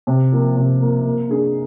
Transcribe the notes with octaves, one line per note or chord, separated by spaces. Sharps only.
C3
F3 A#3
C3
F3 A#3
A#3
D4 G#4